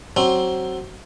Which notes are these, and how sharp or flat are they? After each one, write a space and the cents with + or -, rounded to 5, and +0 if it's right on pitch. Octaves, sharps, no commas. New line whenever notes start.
F#3 +20 C4 +20